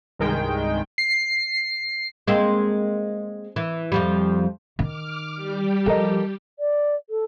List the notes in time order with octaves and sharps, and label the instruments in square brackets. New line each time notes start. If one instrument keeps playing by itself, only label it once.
[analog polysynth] C2 G2 D#3 G#3 G5
C7
[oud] G#3 A#3 C4
E3
F2 F3 G3
[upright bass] D#3 [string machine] D6 F6
[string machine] G3 G4
[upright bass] F3 [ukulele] A4 A#4 D#5
[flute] D5
A4